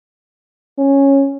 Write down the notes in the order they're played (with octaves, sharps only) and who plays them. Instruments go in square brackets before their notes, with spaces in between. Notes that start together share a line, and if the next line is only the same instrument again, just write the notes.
[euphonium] C#4